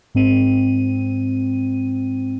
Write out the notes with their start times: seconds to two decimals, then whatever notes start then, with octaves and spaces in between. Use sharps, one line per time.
0.15 G#2 C4 D#7